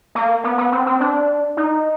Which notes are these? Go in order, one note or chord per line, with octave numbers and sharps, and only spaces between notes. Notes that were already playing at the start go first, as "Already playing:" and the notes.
A#3
B3
B3
C4
C4
D4
D#4